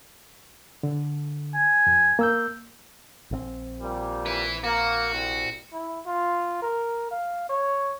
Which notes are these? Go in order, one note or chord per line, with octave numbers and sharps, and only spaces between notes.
D3
G#5
F2
A#3 E6 G6
A#1 D3 C4
A#2 G3
E4 B4
A#3 F#4
C2
E4
F4
A#4
F5
C#5